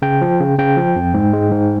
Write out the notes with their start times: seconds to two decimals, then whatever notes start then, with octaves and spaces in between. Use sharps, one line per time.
0.02 C#3 G5
0.21 F3
0.40 C#3
0.58 C#3 G5
0.77 F3
0.96 F2
1.14 G#2
1.33 G#3
1.51 G#2